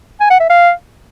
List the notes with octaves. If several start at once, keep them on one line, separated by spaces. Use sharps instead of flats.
G#5
F#5
E5
F5